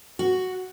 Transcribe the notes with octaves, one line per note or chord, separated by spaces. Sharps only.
F#4